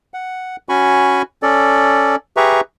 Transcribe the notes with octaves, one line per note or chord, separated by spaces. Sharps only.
F#5
C#4 F#4 G#5 B5 C#6
C#4 A4 D5
G4 G#4 B4 E5 A#5 C#6